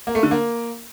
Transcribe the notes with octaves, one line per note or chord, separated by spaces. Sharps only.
A#3
A3
D3
A#3